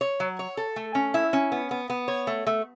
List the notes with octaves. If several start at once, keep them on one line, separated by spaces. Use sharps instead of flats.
C#5
F#3
C#5
A4
A3
C#4
E4
C#4
B3
B3
B3
C#5
A3
A3